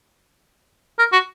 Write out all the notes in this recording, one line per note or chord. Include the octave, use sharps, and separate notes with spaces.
A#4
F#4